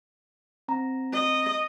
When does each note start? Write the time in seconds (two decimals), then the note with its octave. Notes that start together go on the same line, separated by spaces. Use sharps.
0.68 C4 A#5
1.12 D#5